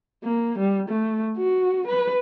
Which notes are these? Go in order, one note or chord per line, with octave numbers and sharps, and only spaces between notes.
A#3
G3
A3
F#4
B4